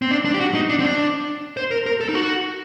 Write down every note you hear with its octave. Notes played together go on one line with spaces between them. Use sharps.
C4
D4
D4
G4
F#4
D#4
D4
C4
D4
C5
A#4
A#4
A4
D#4
F#4